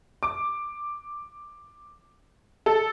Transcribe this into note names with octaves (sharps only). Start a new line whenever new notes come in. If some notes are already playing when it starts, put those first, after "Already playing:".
D6
A4